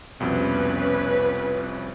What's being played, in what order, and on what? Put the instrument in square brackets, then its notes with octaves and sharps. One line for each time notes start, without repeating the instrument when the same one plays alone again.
[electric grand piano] C2 F2 B2 [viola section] C#4 B4